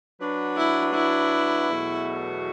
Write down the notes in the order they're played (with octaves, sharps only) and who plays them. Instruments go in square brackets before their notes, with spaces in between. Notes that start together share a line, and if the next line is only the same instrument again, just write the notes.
[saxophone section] F#3 D4 F#4 B4
[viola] E4
E4
[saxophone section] E2 B2 F#3 A3 F#4